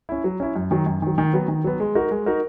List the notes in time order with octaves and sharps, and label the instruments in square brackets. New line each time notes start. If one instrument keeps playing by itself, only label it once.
[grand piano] C#4 E4
F#3
C#4 E4
F#2
D#3 F#3
F#2
D#3 F#3
D#3
F#3 B3
D#3
F#3 B3
G#3
D#4 F#4 A#4
G#3
D#4 F#4 A#4